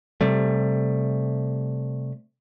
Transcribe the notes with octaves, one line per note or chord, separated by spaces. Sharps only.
C3 G3 A3